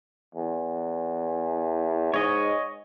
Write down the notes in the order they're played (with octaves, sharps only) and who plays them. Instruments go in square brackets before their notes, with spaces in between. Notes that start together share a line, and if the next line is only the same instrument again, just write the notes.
[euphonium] E2
[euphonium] G#2 [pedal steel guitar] C#5 D#5